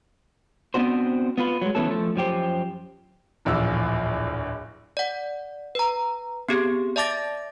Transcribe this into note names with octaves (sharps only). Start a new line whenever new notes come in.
B3 C4 D4 F#4 C5
B3 F4 B4
F#3 G#3
E3 A3 B3 C#4 A4
F3 A3
F#2 F3 G4 C5
D1 A#1 E2 F4 E6
D5 F#5
B4 A#5
B3 C4 G4 G#4
D5 E5 A5 D6 A6 A#6